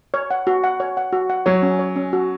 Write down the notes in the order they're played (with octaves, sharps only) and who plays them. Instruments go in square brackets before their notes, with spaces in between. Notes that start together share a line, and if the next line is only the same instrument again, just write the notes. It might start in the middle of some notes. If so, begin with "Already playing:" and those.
[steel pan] C#5
F#5
F#4
F#5
C#5
F#5
F#4
F#5
[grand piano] F#3 [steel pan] C#5
[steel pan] C#4
C#5
C#4
F#4